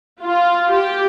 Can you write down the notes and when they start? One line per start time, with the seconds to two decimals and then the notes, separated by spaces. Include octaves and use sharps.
0.22 F4
0.72 G4